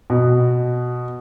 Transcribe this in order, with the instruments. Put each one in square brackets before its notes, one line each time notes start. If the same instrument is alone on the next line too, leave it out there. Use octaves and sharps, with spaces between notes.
[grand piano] B2